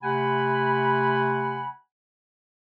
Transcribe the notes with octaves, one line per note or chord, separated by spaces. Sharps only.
C3 A3 F#5 G#5 B5